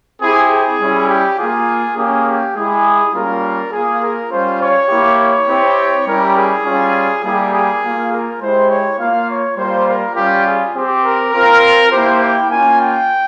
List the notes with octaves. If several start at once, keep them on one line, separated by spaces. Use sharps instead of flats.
C4 E4 G4 G#4
G#4
G3 C#4 E4
G4
A#3 F4 G#4
A#3 C#4 G4 G#4
G4
G#3 E4 G4 G#4
G3 A#3 C#4 F4 A#4
A#3 F4 G#4
A#4
G3 C#4 F4 C5
C#5
A#3 E4 G4
C#5
C4 E4 G4
G3 C#4 E4 G4 A#4
G#4
G3 C#4 F4
G3 A#3 E4 G4 G#4
G#4
A#3 F4
A#4
G#3 E4 G4 C5
C#5
A#3 F4 F5
C#5
G3 A#3 F4 C5
A#4
G3 C#4 F4 G4
G#4
C4 G4
A#4
C4 F4 A#4
A#3 E4 G4 C5
G5
A#3 C#4 F4 G#5
G5